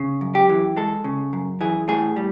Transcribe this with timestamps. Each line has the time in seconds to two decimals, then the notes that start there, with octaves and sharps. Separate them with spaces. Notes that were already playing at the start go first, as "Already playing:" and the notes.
Already playing: C#3
0.21 F#2
0.35 G4
0.49 E3
0.77 G#3 A4
1.04 C#3
1.33 F#2
1.61 E3 G#4
1.88 A2 G#4
2.16 G3